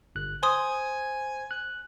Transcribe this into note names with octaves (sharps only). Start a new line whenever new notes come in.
G1 F#6
C5 G#5 C6 D#6
F#6